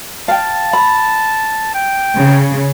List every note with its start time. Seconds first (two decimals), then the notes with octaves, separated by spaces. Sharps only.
0.28 F5 G5 A5
0.73 B5
1.74 G5
2.16 C#3